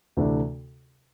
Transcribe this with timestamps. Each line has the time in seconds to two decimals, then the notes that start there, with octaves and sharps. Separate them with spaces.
0.17 D2 C3 E3 A3 D4